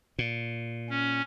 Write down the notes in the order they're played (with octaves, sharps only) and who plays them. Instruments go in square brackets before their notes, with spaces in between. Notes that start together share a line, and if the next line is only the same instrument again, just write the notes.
[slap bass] A#2
[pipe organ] C#4